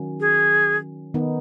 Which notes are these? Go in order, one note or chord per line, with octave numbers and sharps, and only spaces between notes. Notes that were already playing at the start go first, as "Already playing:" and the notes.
Already playing: D#3 F#3 C#4 F#4
G#4
D#3 B3 D#4